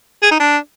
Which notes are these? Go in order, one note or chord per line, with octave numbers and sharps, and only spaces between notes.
G#4
D#4
D4